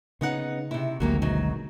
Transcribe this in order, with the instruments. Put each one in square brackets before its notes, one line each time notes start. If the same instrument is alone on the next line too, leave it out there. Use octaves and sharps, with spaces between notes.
[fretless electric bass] C#3 [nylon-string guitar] B3 D#4 F#5
[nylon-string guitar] C3 E4
[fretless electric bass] G#1 D2 G#2 [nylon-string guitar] F#3 A#3 G4
[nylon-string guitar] B2 F#3 D#4